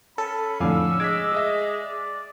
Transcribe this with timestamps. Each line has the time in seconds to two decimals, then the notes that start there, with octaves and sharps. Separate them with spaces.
0.18 C#4 A4 B5
0.60 F2 A2 D3 F5 G#5 D6 E6
1.00 G#3 D6 G#6 B6
1.32 G#4 D#5 E5
1.81 D5